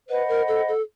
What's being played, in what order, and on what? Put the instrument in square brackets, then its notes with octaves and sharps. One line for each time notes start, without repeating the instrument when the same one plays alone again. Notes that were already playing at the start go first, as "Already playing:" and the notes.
[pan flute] B4 [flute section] C5 D#5 F#5 B5
[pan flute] A#4
A4
A4